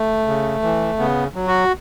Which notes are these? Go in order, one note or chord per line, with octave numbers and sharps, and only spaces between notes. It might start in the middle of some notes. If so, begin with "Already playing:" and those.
Already playing: A3
C#3
E3
C#3 B3
F#3
F#4